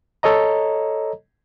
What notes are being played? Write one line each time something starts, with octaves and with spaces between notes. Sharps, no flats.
A4 C#5 D#5 A#5